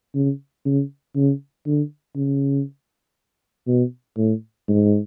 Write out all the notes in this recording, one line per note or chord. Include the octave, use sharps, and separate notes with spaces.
C#3
C#3
C#3
D3
C#3
B2
A2
G#2